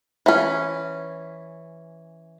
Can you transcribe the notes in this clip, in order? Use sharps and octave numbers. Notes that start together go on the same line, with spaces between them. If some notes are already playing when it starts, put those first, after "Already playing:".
E3 C#4